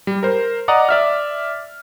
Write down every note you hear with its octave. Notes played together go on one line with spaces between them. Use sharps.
G3
A#4 C5
D5 D#5 F#5 A#5 D#6
D5 E5 F6